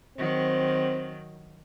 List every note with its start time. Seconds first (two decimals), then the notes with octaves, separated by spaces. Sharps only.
0.17 D#3 F#3 C4